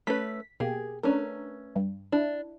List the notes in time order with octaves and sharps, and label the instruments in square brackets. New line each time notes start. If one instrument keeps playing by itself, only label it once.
[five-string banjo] A3 C#4 B4 [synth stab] B6
[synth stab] B2 A#3 G4 [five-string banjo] G#4
[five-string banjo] A3 C#4 B4 [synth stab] D4 A#4
[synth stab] G2
[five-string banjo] D4 [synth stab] E4